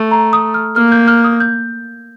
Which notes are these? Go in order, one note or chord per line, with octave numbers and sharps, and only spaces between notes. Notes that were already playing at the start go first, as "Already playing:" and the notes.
Already playing: A3
A#5
D#6
F6
A#3 F6
G6
F6
D#6
G6